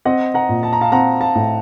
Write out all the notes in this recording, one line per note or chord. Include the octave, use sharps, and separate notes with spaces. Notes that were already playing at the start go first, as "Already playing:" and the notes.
C4 D#5 F#5
F#5 A#5
A#2
A5
A#5
F5 A5
C4 F#5 A#5
F5 A5
A2